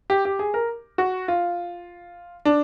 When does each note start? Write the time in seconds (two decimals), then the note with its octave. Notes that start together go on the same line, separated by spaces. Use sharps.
0.10 G4
0.25 G4
0.39 G#4
0.54 A#4
0.98 F#4
1.28 F4
2.45 D4